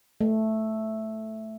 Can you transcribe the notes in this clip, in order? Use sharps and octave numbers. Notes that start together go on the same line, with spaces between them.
A3